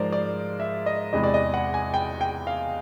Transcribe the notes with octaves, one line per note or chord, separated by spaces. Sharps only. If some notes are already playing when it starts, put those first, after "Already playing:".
Already playing: G#2 F3 G#3 A#4 C5 D5
D5
E5
D#5
E2 C3 E3 G#3 D#5
D5
D#5
F#5
G#5
G5
G5
F5